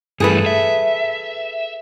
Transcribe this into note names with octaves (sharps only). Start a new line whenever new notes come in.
G2 E3 A3 G#4 A4 B4
E5